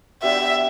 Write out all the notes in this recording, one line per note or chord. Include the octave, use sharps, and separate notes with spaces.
B3 D4 G4 E5